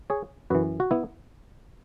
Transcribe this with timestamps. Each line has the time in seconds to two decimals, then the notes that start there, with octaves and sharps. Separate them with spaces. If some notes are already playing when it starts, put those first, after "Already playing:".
0.10 G#4 C#5
0.50 F#2 E3 F#4 B4
0.80 F#4
0.91 B3 E4